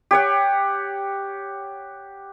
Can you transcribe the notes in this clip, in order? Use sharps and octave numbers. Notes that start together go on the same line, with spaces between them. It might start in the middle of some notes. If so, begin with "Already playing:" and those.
G4 C#5 F#5